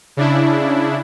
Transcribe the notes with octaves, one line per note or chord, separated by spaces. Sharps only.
C#3 D4 E4